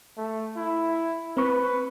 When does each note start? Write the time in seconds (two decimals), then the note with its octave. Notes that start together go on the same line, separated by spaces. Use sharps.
0.17 A3
0.57 E4
1.37 C4 B4 C#6